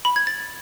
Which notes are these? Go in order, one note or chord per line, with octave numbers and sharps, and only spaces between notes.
B5
G#6
A6